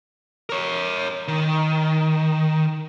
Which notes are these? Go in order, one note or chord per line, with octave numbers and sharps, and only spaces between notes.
A#4 C#5
D#3